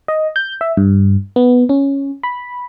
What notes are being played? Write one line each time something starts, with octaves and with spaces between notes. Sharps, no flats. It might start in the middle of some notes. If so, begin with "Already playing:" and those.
D#5
G6
E5
G2
B3
C#4
B5